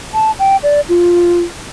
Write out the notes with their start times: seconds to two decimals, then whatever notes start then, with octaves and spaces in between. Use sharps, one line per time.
0.14 A5
0.39 G5
0.63 D5
0.89 F4